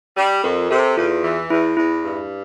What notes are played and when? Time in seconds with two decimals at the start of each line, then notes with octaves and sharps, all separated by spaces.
0.17 G3
0.44 F2 A#4
0.70 C3 A4
0.97 E2 F4
1.23 E3
1.50 E2 E4
1.77 E2 E4
2.04 G2